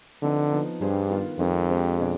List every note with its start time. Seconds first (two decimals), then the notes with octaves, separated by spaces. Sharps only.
0.22 D3 F3 C4 D#4 B4 D#5
0.51 F3 B3 D#4
0.81 G2 G3 D4 G#4 C5
1.10 D#3 B3 F4
1.39 F2 D#3 G#3 C4
1.69 G#3 D4 G4 C5
1.98 B2 G#3 D4 G#4 D5